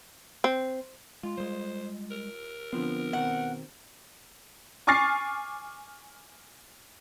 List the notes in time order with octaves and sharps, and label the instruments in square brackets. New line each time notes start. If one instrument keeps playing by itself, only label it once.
[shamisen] C4
[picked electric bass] G#3 [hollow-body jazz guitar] F4
[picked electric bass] G3 G#3 [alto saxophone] C5
[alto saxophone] A#4
[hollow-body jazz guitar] D3 F3 C4 [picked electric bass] B3
[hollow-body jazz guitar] B2 D#3 C4 [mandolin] F#5
[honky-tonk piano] G#5 C#6 D6 F6 A6 C7